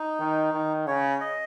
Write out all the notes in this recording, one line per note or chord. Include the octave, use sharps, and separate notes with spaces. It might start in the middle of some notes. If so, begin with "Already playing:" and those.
Already playing: D#4
D#3
D#3
C#3 C#5
D#5